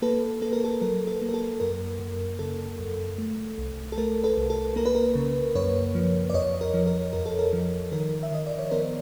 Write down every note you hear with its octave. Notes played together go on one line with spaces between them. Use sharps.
A#3 A4 B4
A#3 A4
A#4
A4
F#3 A#4
A4
A#3
A#4
A4
F#2 A#4
F#2
C#3 A4
F#2
A3
C2
A4
A3 A#4
A4 B4
C2
A4
A#3 A#4
B4
A#4
C#3
F#2 B4 C#5
F3
D5
F2 C#5 D#5
A#4
F3
A#4
F2 A#4
A4
A#4
F3
D#3 A#4
E5
D#3 D#5
D5
C#5
B3 A#4 C5